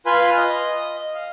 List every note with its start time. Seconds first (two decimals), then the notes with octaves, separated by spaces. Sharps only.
0.06 F4 B4 F5 G#5 B5 C6
0.37 D#5
1.14 F5